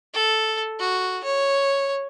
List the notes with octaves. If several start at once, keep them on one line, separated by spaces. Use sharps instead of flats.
A4
F#4
C#5